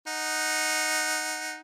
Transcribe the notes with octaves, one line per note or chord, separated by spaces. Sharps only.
D#4 F#5